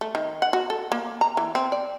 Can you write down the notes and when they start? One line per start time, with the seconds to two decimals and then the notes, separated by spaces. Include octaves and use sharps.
0.01 A3
0.15 D#3
0.42 F#5
0.53 F#4
0.70 A4
0.92 A#3
1.21 A#5
1.37 E3
1.55 C4
1.72 D5